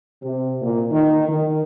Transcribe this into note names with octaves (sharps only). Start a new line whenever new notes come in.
C3
A#2
D#3
D#3